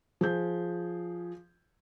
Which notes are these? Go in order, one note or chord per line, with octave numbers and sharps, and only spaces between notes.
F3 G#4 G6